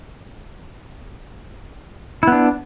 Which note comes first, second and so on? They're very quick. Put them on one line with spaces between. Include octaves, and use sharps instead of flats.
E4 B3 D4